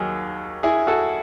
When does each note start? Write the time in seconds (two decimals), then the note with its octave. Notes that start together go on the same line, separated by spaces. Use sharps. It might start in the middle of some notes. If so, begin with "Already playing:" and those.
Already playing: D#2 D#3 F#3 G#4
0.63 E4 G#4
0.87 F#4 A4